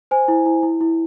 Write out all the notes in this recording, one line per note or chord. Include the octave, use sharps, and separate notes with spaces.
C5 G#5
E4
E4
E4
E4